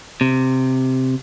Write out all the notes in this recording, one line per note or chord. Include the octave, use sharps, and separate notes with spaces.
C3